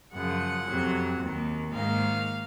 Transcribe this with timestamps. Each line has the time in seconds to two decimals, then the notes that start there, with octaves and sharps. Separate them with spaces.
0.12 F#2 C#3 F3 F#5
0.66 F2 C3 F#3
1.19 D#2 D#3 A#3
1.72 G#2 D#3 A#3 D#4 F5